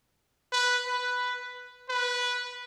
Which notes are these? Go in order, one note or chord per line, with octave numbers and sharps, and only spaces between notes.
B4
B4
B4